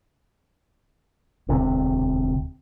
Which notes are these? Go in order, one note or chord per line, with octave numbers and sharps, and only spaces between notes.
E1 D2 C3